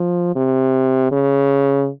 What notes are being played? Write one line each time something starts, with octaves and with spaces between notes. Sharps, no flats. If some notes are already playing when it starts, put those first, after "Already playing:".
Already playing: F3
C3
C#3